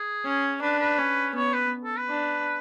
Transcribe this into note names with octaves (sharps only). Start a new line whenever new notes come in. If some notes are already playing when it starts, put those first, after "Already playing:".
Already playing: G#4
C#4
D4 B4
B4
C#4
B3 C#5
B4
A4
B4
D4